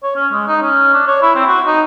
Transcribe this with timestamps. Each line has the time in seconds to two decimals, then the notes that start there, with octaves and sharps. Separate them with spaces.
0.03 C#5
0.16 C#4
0.32 G#3
0.48 D#4
0.62 C#4
0.94 D4
1.07 C#5
1.22 E4
1.35 C4
1.47 F#4
1.66 D#4